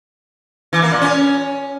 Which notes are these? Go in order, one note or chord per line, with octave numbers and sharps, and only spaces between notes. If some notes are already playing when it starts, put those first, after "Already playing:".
E3
A#3
A#2
C#4